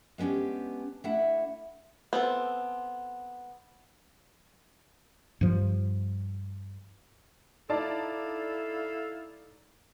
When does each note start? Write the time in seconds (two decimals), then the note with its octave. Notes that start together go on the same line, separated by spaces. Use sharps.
0.18 G#3 B3 C#4 D4 G4
1.04 A3 D4 E4 E5 F#5
2.13 B3 C4 A4
5.41 G2 F3
7.70 D#4 E4 A4 D5 F5 A5